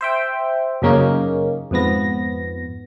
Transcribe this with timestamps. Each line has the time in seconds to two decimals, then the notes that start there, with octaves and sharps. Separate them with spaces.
0.01 C5 E5 G5
0.82 F#2 C#3 A#3 C#4 D#4
1.71 F2 G#2 F3 B3 A#6